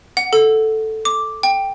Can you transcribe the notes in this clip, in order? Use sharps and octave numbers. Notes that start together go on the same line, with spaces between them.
F#5
A4
D6
G5